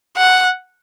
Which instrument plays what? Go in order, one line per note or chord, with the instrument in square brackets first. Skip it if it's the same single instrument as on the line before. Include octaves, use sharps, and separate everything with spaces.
[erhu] F#5